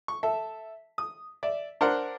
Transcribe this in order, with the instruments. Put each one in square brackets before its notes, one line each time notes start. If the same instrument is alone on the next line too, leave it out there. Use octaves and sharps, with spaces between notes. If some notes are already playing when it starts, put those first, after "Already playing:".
[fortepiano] C#6
A4 E5
D#6
D5 E5
D4 A#4 C5 F#5